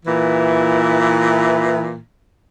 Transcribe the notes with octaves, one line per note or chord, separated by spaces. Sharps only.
A#2 E3